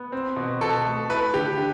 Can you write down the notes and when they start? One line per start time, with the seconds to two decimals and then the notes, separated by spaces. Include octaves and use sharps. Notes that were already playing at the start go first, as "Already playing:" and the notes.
Already playing: B3
0.12 C4
0.36 B2
0.61 B2 A4
0.86 A3
1.10 E4 B4
1.33 D3 G4
1.57 D3